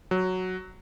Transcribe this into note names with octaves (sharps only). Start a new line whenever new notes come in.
F#3